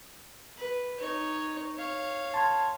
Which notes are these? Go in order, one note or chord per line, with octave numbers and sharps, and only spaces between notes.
B4
D#4 C#5
C#5 F5
A5 C6 G#6